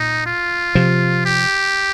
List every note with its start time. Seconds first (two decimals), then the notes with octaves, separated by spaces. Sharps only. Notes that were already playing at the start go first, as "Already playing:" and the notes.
Already playing: A#2 D#4
0.26 F4
0.75 C3 F3
1.25 G4